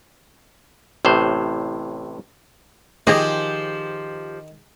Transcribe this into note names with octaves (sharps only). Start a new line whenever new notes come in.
A1 A2 C3 C5
D#3 F3 G4 G#4 D#5